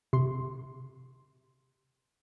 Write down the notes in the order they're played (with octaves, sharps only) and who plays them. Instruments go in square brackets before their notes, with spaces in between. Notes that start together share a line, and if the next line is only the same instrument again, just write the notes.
[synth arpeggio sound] C3 C6